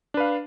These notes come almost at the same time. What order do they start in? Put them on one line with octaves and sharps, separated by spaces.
D4 B4 F5